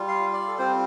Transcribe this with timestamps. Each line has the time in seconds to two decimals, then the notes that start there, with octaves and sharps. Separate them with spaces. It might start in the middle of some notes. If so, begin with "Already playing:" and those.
Already playing: G3 F4
0.08 F5
0.33 D5
0.48 A4
0.58 G3 C4 F4 C5